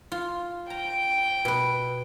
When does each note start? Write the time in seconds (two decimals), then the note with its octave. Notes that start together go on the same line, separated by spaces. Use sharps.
0.12 F4
0.70 G5 A#5
1.45 B2 B4